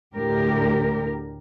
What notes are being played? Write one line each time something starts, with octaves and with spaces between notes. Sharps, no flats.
D2 A2 D3 G4 A#4